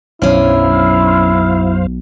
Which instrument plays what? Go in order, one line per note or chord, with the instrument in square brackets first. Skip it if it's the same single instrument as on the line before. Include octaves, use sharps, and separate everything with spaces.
[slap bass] B1 [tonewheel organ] F#2 C5 F5 [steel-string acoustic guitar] C#4 D4 [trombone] E4